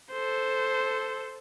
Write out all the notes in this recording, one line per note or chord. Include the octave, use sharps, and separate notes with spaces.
A4 C5